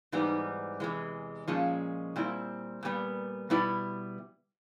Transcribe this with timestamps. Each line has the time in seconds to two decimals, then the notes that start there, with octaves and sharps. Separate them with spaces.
0.12 G#2 E3 G3 B3 D#4
0.80 E2 C3 E3 G#3
1.48 A#2 F3 G#3 C#4
2.16 A#2 G3 C4 E4
2.83 A#2 G3 B3
3.50 B2 G3 B3 E4